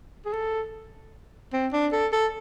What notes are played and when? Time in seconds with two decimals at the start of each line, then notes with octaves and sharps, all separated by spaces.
0.26 G#4
0.33 A4
1.53 C4
1.73 D4
1.93 A4
2.13 A4